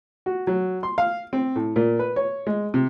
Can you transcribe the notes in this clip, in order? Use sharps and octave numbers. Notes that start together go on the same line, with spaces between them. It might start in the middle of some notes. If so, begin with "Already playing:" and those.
F#4
F#3
C6
F5
C4
A2
A#2
B4
C#5
G#3
C3